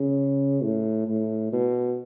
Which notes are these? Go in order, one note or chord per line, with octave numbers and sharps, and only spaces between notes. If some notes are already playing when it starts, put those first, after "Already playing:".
Already playing: C#3
A2
A2
B2